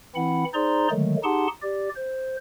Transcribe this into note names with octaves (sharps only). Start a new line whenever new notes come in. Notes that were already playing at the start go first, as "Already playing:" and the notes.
E3 C4 E4 F#5 B5
D#4 G#4 C5 D5 A#5 C6
D3 D#3 F#3 G#3 A3
D#4 G4 G#4 F#5 A5 C6
G4 D5
C5